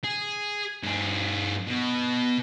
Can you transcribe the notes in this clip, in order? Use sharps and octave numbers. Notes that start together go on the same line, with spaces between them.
G#4
G2 G#4
B2